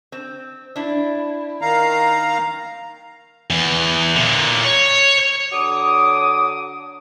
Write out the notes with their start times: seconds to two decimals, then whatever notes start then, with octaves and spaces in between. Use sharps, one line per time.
0.12 C4
0.76 D4 E4
1.62 D#3 F5 A#5
3.50 E2
4.15 A#2 D3
4.64 C#5
5.52 D3 F#3 D6 D#6